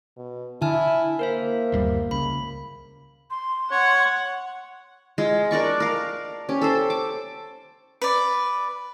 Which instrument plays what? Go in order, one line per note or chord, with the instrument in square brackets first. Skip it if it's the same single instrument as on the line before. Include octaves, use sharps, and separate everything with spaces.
[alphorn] B2
[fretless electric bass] D3 [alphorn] E4 [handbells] G#5 A5 F6
[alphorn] A#3 [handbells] A#4 C5 E5
[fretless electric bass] G1 D#2 G3
[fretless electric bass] C#2 [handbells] B5
[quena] C6
[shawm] C#5 [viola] F#5
[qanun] G#3 F4
D4 A#4 D5 C#6
A#4 F5
C#4 G4
A4 C5
D6
[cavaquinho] B4 D5